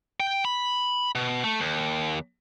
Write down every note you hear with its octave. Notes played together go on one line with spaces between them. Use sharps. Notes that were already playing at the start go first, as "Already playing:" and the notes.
G5
B5
B2
A3
D#2